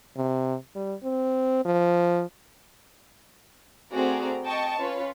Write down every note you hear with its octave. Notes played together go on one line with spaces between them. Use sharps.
C3
G3
C4
F3
A3 C4 F#4 G#4 D5 A#5
D#5 G5 A5 C#6
C#4 F4 B4 C#5